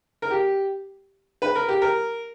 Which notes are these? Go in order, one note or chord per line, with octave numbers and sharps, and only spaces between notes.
A#4
G4
B4
A#4
G4
A#4